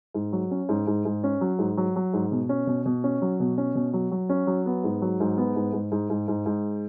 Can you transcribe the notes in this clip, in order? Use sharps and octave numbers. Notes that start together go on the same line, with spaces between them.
G#2
F#3
C#4
G#2
G#2
G#2
C#4
F#3
G#2
F#3
F#3
G#2
B2
C#4
B2
B2
C#4
F#3
B2
C#4
B2
F#3
F#3
C#4
F#3
B3
G#2
F#3
G#2
B3
G#2
G#2
G#2
G#2
G#2
G#2